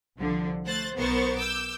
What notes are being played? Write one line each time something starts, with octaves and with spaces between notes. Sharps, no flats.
C2 D3 F3
A3 C5 F#6 A6
B1 B3 A#4 C5 C#6 A6
D6 E6 G6